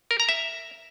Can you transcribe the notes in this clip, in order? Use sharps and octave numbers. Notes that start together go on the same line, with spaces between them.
A#4
A#5
E5